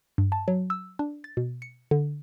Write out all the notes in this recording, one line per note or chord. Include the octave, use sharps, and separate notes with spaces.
G2
A5
F#3
E6
D4
A6
B2
C#7
D3